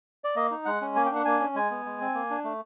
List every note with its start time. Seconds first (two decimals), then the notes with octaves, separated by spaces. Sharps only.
0.24 D5
0.36 A#3 D#5
0.51 D#4
0.65 G#3 F#5
0.81 C#4
0.96 A#3 G#5
1.06 G5
1.10 D4 F#5
1.25 A#3 G#5
1.40 C#4
1.55 G#3 G#5
1.71 B3
1.85 G#3
2.01 C4
2.14 A#3
2.30 D4
2.44 A3